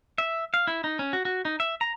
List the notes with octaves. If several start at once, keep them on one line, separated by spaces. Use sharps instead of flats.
E5
F5
E4
D#4
C#4
F#4
F#4
D#4
E5
A#5